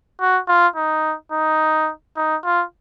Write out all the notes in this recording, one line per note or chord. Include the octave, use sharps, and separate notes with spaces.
F#4
F4
D#4
D#4
D#4
F4